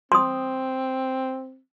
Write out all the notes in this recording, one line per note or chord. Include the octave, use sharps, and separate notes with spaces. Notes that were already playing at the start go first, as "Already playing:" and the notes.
C4 C6 D#6